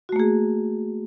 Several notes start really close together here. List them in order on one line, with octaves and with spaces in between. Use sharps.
F#4 A3 A#3 G#4